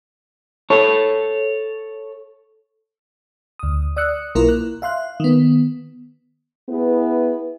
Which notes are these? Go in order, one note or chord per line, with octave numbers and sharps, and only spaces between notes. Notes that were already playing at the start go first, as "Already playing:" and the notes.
A4 C#5
D2 D#6
D5 D#6 E6 F#6 C#7
B1 A#3 E4 F4 A#4
F#6
E5 F5 C6 F#6
D#3 B3
B3 E4 G#4 B4